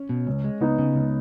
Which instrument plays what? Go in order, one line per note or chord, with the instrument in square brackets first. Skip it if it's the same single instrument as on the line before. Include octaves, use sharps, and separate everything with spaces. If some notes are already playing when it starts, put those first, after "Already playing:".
Already playing: [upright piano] C#4
[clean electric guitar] B2
C#2
G#3
[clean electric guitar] C#2 [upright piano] B3 D#4
[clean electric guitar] C#3
C#2